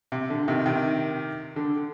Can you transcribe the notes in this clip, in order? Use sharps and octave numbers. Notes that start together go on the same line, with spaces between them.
C3
D3
C3 D#3
C3 D#3
D3